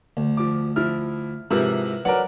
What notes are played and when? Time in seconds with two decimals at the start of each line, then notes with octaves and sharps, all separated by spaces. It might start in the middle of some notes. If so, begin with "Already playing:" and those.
0.17 D2
0.37 F3 D6
0.76 F3 E4 F6
1.51 G#2 C3 F3 E4 A#4 B4
2.05 F#3 A#4 B4 D5 F#5